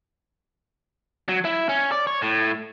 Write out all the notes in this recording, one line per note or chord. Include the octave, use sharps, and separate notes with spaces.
F#3
E4
C#4
D5
C#5
A2